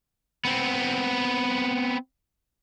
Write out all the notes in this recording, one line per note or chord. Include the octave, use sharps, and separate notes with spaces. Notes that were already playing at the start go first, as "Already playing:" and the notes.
B3 C4